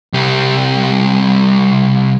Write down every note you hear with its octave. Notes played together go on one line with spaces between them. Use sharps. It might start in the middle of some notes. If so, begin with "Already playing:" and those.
C2 G3